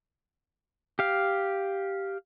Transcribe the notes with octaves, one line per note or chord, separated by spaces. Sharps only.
G4 F5